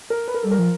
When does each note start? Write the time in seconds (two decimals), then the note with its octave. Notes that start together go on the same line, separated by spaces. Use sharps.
0.10 A#4
0.28 B4
0.34 A#4
0.43 G3 A4
0.51 A#4
0.59 F3